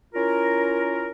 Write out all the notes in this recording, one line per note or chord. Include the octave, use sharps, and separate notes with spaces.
C#4 E4 F4 A#4